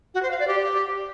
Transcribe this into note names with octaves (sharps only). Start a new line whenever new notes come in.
F#4
C5
F5
D5
G4